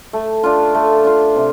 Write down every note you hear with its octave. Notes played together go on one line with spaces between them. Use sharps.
A3
D4 F4
A3
D4 F4
C3